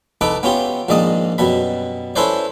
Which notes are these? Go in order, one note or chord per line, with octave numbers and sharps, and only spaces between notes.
C2 D#4 A4 B4 D6
B3 C#4 F4 G4
A#1 G#2 D#3 D5 D#5 D#6
F#2 B2 G3 B5
C#4 E4 A4 B4 C5 D5